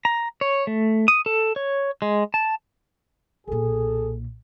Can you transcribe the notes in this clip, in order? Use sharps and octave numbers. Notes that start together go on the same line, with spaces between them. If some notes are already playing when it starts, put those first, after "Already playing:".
A#5
C#5
A3
D#6
A4
C#5
G#3
A5
B1 A#2 G#4 A4